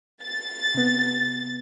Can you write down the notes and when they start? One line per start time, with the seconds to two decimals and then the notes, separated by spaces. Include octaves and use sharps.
0.23 A6
0.74 C3 B3